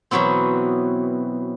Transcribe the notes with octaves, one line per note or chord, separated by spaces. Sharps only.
B2 E3 F#3 B3 C4